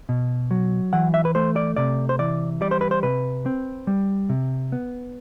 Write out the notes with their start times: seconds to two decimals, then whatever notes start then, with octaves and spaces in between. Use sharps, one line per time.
0.09 B2
0.51 F#3
0.93 E3 F#5
1.14 E5
1.25 B4
1.35 A3 C5
1.56 D5
1.76 C3 D5
2.09 C5
2.19 E3 D5
2.61 G3 D5
2.71 C5
2.81 B4
2.91 C5
3.03 C3 B4
3.46 C4
3.87 G3
4.29 C3
4.72 B3